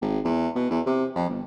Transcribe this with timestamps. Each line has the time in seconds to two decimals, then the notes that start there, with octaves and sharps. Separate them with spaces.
0.02 G#1
0.25 E2
0.55 B2
0.71 E2
0.86 C3
1.15 F2
1.29 G1